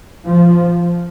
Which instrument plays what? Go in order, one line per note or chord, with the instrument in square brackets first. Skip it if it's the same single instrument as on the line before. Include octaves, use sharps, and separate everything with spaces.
[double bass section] F3